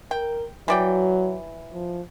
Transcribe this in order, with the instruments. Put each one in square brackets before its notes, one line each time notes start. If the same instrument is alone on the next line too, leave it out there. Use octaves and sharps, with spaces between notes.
[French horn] A#4 [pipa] G5
[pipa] E3 D5 G5 [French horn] F#3
[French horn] F3